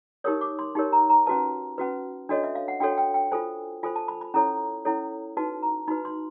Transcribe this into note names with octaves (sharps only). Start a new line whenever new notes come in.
D#4 G4 A#4 C#5 D#6
D6
C6
D#4 G4 A#4 C#5
A#5
A#5
C#4 F#4 B4 A5
C#4 F#4 B4
D4 F#4 A4 C#5 D#5
E5
F5
F#5
D4 F#4 A4 C#5 G5
G5
G5
F4 A4 C5 G#5
F4 A4 C5 G#5
A5
B5
B5
C#4 E4 A4 C#5 A#5
C#4 E4 A4 C#5
D#4 F#4 B4 A5
A#5
D#4 F#4 B4 B5
C6